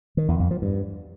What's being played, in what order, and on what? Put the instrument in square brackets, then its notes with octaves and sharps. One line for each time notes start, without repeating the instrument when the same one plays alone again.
[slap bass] D#3
E2
F2
F3
G2